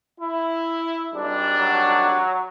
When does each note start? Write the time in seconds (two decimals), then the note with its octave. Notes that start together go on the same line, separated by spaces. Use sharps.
0.20 E4
1.13 G#1 G3 D4
1.59 F#3